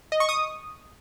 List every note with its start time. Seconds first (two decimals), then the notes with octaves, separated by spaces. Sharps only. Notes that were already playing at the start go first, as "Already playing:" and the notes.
0.12 D#5
0.20 C#6
0.29 D#6